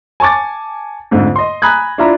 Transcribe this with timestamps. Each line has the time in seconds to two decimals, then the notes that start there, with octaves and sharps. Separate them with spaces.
0.20 G#5 A5 C#6 D6 A6
1.11 F2 G#2 D3 A3
1.36 D#5 C6
1.62 G#5 A#5 B5 D#6 F#6 G#6
1.98 D4 E4 F4 E5 A#5 B5